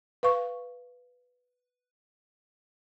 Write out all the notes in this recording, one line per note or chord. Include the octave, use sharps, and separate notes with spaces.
B4 F5 C#6